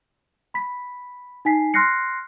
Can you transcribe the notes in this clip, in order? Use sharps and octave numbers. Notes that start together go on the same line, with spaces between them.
B5 B6
D#4 G#5 B6 C7
C6 F6 F#6 A#6 C7 C#7